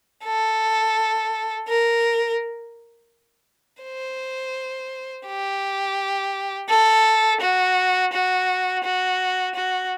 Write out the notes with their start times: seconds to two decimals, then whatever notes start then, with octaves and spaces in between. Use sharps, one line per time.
0.24 A4
1.68 A#4
3.83 C5
5.27 G4
6.69 A4
7.41 F#4
8.13 F#4
8.84 F#4
9.55 F#4